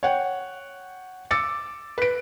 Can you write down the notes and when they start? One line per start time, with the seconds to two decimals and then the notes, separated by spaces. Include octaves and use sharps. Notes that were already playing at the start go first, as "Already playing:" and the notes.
0.03 C#5 F#5 G5
1.31 D6 E6 A6 C#7
1.98 B4 D7